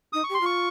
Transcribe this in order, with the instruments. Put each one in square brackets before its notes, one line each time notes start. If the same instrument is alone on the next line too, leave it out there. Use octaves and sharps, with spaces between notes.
[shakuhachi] D#4 [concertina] D#6
[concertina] C#6
[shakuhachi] G4 [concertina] C6
[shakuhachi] F4 [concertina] C#6